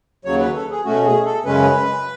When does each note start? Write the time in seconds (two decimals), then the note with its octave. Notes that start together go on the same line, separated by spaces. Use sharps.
0.25 D#2 C#3 F#3 C#5
0.40 B4
0.55 A4
0.70 G#4
0.85 B2 A3 C#4 F#4
1.05 G#4
1.25 A4
1.45 F#2 C#3 G#3 C#4 B4